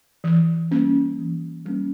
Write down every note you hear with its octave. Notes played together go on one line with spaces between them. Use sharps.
E3
G3 A#3 C#4
E3
G3 A#3 C#4